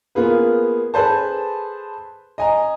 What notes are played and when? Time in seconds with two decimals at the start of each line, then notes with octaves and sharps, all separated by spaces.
0.15 A#3 B3 F4 G#4 B4
0.94 G#4 A4 B4 C5 A5
2.38 D#5 G#5 A#5